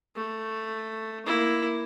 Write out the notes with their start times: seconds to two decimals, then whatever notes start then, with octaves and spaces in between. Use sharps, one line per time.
0.16 A3
1.26 A#3 E4